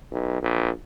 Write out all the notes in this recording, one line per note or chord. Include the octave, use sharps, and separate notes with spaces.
B1
A#1